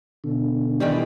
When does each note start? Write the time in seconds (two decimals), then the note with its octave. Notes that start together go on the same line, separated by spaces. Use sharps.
0.24 B2 D3
0.80 D#3 E3 G3